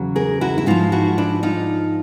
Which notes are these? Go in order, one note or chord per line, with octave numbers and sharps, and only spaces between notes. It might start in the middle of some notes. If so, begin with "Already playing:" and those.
Already playing: E2 C#3 F#3
G#4 A#4
E4 F#4
E4
G#2 F3 D#4 F4
E4 F#4
D4 E4
D#4 F4